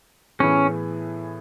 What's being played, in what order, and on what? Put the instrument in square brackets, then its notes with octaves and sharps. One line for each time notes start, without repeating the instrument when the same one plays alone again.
[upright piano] A2 E3 B3 E4 G#4 [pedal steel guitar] C#4